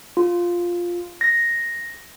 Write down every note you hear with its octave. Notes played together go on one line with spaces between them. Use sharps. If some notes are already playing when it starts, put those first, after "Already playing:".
F4
A#6